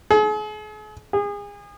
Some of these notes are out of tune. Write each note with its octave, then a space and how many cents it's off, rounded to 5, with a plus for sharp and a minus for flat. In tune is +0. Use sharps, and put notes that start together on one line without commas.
G#4 +40
G#4 -30